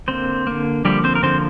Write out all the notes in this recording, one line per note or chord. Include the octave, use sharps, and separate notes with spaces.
D3 A#3 C4 C5
D3 A#3
D3 F3 G3 A#3 G4
C4 C5
A#4
D3 F3 A#3 C4 C5